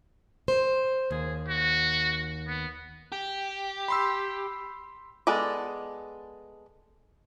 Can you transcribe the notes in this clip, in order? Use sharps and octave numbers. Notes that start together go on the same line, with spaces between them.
C5
D#2 G#4
F#4
B3
G4
B5 C6 E6
G#3 B3 G#4 A4 D5